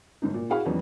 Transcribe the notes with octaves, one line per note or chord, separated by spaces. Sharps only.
G1 G#2 D#4
A#2
E4 F#4 G#4 F5 F#5 B5
F2 E3 G3 B3 C#4 D#4